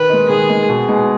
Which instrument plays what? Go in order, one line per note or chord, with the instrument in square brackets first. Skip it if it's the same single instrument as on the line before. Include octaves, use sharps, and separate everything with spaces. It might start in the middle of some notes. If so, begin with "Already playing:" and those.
Already playing: [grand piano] D#3 [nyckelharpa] B4
[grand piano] G#3 D#4
[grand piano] D#3 [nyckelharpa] G#4
[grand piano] G#3 D#4
B2
G#3 B3 D#4 G#4